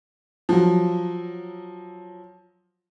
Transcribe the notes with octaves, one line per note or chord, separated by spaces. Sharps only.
F3 F#3